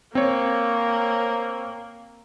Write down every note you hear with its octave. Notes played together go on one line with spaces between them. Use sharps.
A#3 C4 C#5